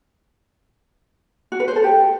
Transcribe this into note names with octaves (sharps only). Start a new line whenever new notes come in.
F#4
B4
C5
A4
G4